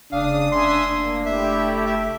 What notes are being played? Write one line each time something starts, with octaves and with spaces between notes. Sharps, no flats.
F1 C#3 D4 F5 D#6
E5 G#5 C6 D#6
A#3 D4
A3 E4 G4 E5
E5